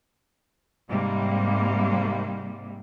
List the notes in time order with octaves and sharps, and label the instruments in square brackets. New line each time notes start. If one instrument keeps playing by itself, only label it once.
[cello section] G#2 C3 G3 A#3